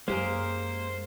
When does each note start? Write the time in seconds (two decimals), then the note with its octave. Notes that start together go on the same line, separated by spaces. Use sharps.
0.08 F#2 G#3 A#3 G4 G#4 A#4 C5